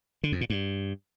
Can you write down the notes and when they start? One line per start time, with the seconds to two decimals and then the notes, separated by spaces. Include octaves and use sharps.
0.23 D3
0.32 F2
0.41 A#2
0.50 G2